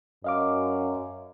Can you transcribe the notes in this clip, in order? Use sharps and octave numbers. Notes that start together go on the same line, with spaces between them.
F#2 D#5 F5 D6